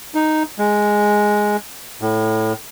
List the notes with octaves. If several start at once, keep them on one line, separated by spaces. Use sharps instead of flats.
D#4
G#3
A2